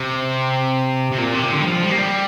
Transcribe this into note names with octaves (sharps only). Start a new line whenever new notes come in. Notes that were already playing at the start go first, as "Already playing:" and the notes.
Already playing: C3
C3
A#2
C3
D3
G3
F3
G3
A#3
G3